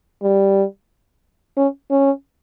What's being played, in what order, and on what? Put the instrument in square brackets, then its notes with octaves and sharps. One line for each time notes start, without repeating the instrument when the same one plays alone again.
[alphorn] G3
C#4
C#4